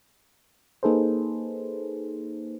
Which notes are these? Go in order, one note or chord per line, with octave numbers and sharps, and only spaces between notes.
A#3 D#4 G#4 A4 B4 C5